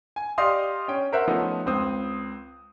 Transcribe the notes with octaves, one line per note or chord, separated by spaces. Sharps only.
G#5
G4 D5 D#5 F5 C6 D#6
C#4 G5
A#4 C5 E5 F#5 F#6
F3 A3 B3 C#4 D#4
C#2 C4 D#6